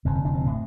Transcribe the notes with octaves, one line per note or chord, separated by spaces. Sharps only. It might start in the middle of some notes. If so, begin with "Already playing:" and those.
F1 F2 D3 C4
C4
D4
C4
A2